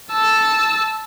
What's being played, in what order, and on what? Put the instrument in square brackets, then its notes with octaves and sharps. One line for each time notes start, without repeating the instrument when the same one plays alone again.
[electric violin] A5 E6